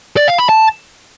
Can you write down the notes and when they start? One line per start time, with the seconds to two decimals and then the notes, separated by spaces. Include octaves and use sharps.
0.17 D5
0.28 F5
0.38 B5
0.49 A5